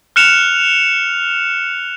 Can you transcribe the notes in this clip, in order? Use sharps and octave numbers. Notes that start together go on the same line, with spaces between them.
F6 F#6 C#7 E7 F7